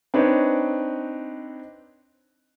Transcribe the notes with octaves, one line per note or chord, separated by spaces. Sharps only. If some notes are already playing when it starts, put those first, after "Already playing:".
C4 D4 D#4 B4 C#5